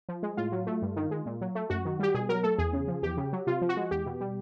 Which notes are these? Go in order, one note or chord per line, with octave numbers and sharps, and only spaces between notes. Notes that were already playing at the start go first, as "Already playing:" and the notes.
F3
G#3
A2 F4
F#3
A3
G2
D#3
G#3
A#2
F#3
A3
F#2 F#4
D#3
G3 G4
B2 G#4
F#3 A#4
A3 A4
E2 G#4
C#3
F3
E2 G4
C#3
F#3
C3 F4
F3
F#4
G#3
E2 G4
B2
G3